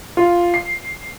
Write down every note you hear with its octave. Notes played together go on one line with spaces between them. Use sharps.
F4
C7